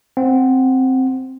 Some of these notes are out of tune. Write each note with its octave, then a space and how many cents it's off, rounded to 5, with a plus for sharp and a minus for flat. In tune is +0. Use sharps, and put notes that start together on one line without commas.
C4 +0 F#5 +0